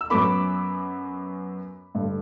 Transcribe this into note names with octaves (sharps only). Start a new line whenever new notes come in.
E6
F#2 F#3 B3 B5 D6
G2 D3 A3